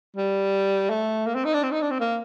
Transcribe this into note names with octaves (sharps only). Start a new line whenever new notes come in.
G3
A3
A#3
C4
D#4
D4
C4
D#4
D4
C4
A#3